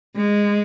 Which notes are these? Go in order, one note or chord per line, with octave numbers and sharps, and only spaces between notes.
G#3